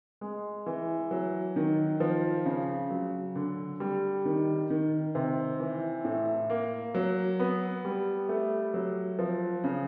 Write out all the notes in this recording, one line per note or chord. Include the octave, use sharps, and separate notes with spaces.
G#3
E3
F#3
D#3
F3
C#3
F#3
D3
G3
D#3
D#3
C3
E3
A2
A#3
F#3
B3
G3
A3
F#3
F3
C#3